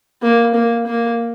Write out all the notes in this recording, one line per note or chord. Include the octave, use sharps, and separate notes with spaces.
A#3
A#3
A#3